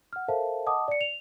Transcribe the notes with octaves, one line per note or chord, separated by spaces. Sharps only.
F#5 F6
A4 A#4 C5 E5 F5 A5
D#5 F#5 A5 D6 D#6
D5 C#7
F7